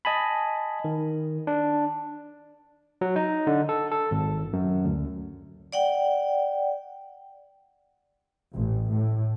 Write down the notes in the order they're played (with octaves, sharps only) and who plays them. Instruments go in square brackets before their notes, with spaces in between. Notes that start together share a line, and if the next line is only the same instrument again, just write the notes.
[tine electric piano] D#5 G#5 A5 B5
D#3
D4
F#3
D#4
D3
A4
A4
G#1
F#2
D2
[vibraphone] D5 F#5 G5
[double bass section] A1
A2